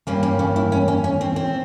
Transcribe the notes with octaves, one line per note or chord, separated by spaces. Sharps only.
G2 G3 A#3 C#4
C#4
C#4
E4
C#4
C#4
C#4
C4
C4